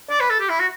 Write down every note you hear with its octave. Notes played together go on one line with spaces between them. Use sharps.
D5
B4
A4
G4
E4
F#4